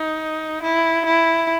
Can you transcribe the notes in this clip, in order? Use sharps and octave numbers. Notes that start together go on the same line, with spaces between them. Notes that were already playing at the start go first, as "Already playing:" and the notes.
Already playing: D#4
E4
E4